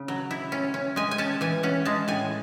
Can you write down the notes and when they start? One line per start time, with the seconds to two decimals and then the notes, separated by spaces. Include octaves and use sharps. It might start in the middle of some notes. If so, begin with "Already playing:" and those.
Already playing: C#3
0.08 F#3
0.31 E4
0.52 C#4
0.74 C#4
0.96 G#3 G#5
1.11 G#5
1.18 C#4 A5
1.41 E3 G#5
1.63 C#4 F#5
1.85 G#3 A5
2.08 A2 G#5